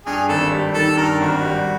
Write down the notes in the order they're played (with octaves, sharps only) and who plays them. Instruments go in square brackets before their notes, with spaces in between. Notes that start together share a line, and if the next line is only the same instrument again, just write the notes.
[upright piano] G2 [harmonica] G#4
[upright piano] G#1 [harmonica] A4
[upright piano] G3
[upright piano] D#3 [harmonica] A4
[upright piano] G2 [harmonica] A#4
[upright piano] G#1 [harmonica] F#4
[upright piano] G3